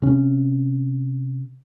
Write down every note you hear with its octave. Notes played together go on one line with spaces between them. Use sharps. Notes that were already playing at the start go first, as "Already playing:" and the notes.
C3 C#4